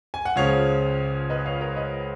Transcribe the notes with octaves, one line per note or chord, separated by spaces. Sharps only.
G#5
F#5
C#2 C#3 F3 C#5 F5
B4 D#5
C#5 F5
A#4 C#5
B4 D#5